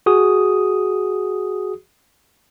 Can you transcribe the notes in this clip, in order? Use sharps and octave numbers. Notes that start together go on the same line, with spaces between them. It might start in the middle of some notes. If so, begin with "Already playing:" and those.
F#4 G#4 D#6